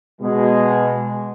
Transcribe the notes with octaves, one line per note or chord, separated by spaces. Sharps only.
B2 G#3